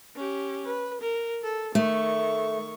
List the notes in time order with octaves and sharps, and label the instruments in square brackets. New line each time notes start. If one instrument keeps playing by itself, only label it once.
[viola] C#4 G4
B4
A#4
A4
[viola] D#3 C#6 [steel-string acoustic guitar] A3